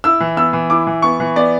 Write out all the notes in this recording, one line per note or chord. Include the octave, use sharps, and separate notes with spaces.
E4 E6
E3
B3 E6
E3
E4 D6
E3
B3 C#6
E3
B3 D5